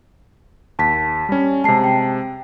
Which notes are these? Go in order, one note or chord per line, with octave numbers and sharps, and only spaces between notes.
D#2 A5 B6
G3 C#4
C3 G#3 A5 C7
G5